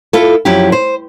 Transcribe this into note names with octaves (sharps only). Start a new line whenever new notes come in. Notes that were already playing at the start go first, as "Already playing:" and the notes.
E4 F4 A4
F#2 F3 F#3 E4 G4
C5